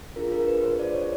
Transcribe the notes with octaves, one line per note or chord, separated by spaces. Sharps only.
D4 F4 G#4 A#4
A#4
B4
C5
D5
C#5